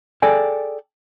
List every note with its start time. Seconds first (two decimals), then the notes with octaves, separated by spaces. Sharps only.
0.22 G#4 A4 D5 G5 G#5